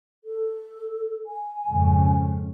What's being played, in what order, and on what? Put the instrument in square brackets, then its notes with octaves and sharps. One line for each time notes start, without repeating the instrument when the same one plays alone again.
[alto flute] A4
G#5
[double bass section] F2 G#2 C#3